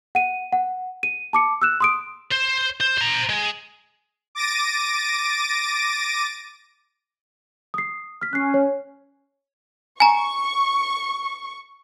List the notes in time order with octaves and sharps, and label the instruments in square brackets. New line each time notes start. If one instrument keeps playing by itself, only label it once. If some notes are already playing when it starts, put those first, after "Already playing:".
[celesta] F#5 D#7
F#5
D#7
A5 D6 C#7
E6 F#6 E7
C6 D#6 D7
[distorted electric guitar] C5
C5
C5 A#5
G#3
[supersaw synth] D6 A6 A#6 D7 D#7
[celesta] D#6 C7
F6 B6
[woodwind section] C#4 [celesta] F#6 C7
[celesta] C#5
[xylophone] G#5 A#5 [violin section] C#6